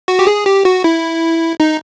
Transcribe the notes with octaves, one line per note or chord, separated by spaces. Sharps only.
F#4
G4
G#4
G4
F#4
E4
D#4